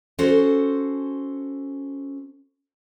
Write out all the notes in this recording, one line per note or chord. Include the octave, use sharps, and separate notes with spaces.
C#4 F#4 A4 C5